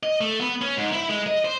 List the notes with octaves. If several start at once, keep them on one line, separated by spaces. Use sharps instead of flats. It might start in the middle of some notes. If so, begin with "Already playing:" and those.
D#5
A3
B3
C#4
G#2
E4
G#3
D#5
C5